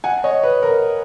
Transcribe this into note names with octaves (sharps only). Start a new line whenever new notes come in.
F#5 G#5
C#5 D#5
B4
A#4